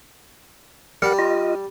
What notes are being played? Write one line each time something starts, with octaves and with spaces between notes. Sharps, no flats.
G3 A#4 F#5
F4 D#5